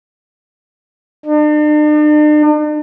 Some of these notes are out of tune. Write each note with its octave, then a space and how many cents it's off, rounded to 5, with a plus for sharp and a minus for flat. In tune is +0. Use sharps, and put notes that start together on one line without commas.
D4 +45